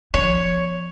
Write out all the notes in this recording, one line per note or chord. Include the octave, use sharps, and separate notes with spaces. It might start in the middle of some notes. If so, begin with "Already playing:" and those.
F3 B3 C#5